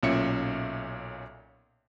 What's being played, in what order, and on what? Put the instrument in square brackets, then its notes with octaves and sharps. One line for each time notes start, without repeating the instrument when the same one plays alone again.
[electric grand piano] B1 A#2 C#4 E5 C#7